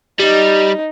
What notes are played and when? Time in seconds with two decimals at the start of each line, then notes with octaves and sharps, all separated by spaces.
0.20 G3 D#4